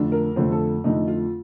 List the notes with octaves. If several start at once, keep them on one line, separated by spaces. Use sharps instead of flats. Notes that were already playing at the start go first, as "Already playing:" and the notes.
Already playing: F2 D3 A3 D4
A#4
F2 D3 A3 D4 C5
A4
F2 D3 A3 D4 D#4
F4